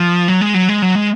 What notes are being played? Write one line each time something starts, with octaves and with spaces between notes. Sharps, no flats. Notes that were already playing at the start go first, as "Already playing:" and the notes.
Already playing: F3
F#3
G#3
F#3
G#3
F#3
G#3